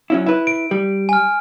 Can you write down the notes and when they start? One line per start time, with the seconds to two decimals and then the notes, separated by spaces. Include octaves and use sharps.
0.10 F#3 C#4 E4
0.26 E4 B4
0.47 D7
0.71 G3
1.09 G#5 F6